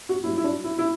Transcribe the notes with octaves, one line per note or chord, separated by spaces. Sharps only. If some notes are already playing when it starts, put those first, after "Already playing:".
F#4
G2 F#3 E4
E4
D4
E4
E4